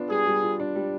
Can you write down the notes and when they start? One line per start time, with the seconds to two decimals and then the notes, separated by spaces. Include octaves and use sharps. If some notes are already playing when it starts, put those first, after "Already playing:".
Already playing: B3 D4 F4
0.09 G3 G#4
0.26 G3
0.42 F4
0.59 D4
0.75 G3